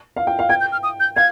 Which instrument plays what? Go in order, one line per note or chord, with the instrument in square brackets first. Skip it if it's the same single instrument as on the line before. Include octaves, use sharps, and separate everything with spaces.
[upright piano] F5
G5
F5
[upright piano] G5 [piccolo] G#6
[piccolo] G6
F6
D#6
G6
[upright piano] F5 [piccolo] G#6